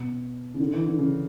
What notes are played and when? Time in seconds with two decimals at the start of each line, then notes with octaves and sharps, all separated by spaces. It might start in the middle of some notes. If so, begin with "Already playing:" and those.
Already playing: B2
0.54 C#3
0.60 D3
0.73 E3
0.86 D3
0.99 C#3